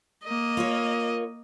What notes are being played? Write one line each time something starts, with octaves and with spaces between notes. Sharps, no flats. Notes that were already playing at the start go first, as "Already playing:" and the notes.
A#3 D#5
F4 A#4 C#5